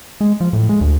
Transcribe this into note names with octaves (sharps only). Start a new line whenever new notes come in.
G#3
F3
A2
G#3
D2